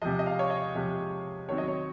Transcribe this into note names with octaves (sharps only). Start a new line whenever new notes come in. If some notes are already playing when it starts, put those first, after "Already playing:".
C3 F3 G#3 D#5
D#5
F5
C#5
D#5
C3 F3 G#3
D#3 F#3 C4 C#5
D#5
C#5